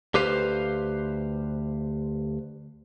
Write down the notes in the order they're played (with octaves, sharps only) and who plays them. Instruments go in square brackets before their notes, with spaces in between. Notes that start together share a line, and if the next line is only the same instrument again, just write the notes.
[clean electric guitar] D2 G4 B4 C5 F5